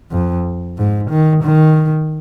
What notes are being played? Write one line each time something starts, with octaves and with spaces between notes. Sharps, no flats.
F2
G#2
D#3
D#3